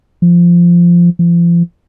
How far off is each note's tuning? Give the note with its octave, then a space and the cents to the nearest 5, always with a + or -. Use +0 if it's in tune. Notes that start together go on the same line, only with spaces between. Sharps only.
F3 -10
F3 -35